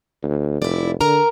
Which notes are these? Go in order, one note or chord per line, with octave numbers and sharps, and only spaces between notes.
D2
F1 E4 D5
D3 A#4 A#5